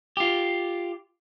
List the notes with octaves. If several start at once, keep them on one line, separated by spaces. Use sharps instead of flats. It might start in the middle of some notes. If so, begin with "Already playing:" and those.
F4 G4